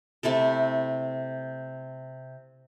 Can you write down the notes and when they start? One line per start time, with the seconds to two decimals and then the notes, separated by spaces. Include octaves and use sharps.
0.23 C3 A3 E4 A4